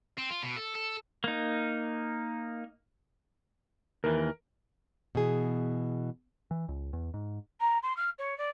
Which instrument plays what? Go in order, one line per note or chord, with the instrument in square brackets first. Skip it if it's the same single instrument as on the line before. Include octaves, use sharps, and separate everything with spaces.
[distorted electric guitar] C4
F4
B2
A4
A4
[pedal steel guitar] A#3 D#4
[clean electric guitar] D#2 E3 [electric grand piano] A#4
[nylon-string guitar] B2 E3 G#4
[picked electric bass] E3
C#2
E2
G#2
[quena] A#5
C6
F6
C#5
D5